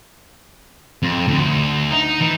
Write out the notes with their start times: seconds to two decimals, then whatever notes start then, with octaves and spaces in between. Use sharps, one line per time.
1.03 F2
1.28 D2
1.90 D#4
2.21 E3